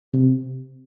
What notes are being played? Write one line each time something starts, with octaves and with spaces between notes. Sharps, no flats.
C3